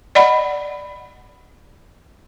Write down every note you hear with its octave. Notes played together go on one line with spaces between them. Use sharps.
D5 D#5 F#5 B5